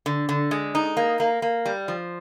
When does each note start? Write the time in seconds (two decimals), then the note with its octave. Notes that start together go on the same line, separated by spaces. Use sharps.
0.06 D3
0.29 D3
0.51 G#3
0.75 D#4
0.97 A#3
1.20 A#3
1.42 A#3
1.65 G3
1.88 F3